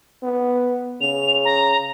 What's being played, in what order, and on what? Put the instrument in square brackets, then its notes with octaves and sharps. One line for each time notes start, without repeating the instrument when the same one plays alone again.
[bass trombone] B3
[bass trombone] C#3 [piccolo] F7
[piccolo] A#5